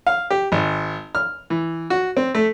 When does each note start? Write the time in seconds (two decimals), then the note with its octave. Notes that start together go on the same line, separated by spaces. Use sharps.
0.07 F5
0.30 G4
0.52 G#1
1.15 F6
1.50 E3
1.90 F#4
2.17 C4
2.35 A3